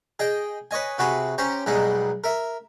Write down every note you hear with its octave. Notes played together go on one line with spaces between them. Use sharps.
G#4 D#5 G5
B4 C#5 D#5 G#5
C3 F#4 G#4 B4
C#4 G4 C5 A#5
B1 B2 G3 G#3 D#4
A#4 E5